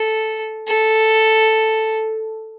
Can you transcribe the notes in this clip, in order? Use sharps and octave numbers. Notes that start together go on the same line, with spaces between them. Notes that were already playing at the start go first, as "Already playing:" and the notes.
Already playing: A4
A4